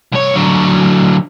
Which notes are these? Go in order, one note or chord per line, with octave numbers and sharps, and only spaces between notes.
C2 C#5
D3 F#3